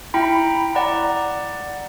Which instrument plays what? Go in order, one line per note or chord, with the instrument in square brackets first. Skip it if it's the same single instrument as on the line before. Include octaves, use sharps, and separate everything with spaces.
[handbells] E4 G5 A#5 B5
D5 F#5 A#5